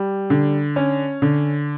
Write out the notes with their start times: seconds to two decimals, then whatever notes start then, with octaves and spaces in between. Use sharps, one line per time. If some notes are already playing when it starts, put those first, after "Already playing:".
Already playing: G3
0.30 D3
0.76 C#4
1.22 D3